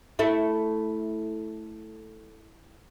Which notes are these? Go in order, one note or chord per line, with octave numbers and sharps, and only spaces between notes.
A3 E4